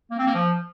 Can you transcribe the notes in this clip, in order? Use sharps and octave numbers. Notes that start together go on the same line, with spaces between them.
A#3
C4
A#3
F3